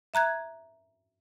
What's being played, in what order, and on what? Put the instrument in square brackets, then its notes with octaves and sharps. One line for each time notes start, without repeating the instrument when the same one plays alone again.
[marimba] E5 A#5 F#6 G#6